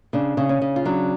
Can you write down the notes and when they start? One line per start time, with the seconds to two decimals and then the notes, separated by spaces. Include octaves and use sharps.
0.13 C#3 D4
0.37 C#3
0.49 C#4
0.61 C#3
0.76 F4
0.85 F#3 D4